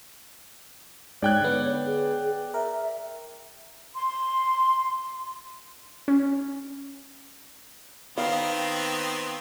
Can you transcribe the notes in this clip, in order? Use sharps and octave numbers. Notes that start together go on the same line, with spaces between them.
G#2 C#5 D5 G5 F#6 G#6
D3 B3
G#4
A#4 E5
C6
C#4
D#3 B3 C4 F5